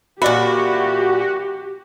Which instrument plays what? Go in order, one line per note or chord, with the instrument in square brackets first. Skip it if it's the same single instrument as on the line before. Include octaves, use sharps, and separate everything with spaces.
[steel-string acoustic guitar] A#2 E5 [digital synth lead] F#4 [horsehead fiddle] G4 [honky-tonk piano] D5 B5